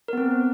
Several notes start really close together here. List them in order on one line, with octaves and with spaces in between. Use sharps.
A#4 B3 C4